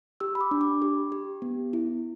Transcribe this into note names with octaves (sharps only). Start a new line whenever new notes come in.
G4 E6
B5
D6
D4
D6
G4
G4
B3
E4